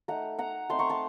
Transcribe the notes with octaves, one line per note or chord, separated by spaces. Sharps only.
A3 D#4 F#5 A#5
F#5 A#5
A3 C4 D#4 A5 C6
A#5 C#6
A5 C6